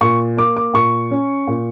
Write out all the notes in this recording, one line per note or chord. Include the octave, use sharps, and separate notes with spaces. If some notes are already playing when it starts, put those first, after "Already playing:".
A#2 C#6
A#3 D6
D6
A#2 C#6
C#4
A#2